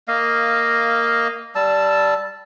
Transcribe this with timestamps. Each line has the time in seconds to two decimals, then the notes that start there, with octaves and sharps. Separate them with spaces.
0.08 A#3 D#5 F5
1.55 G3 A5 E6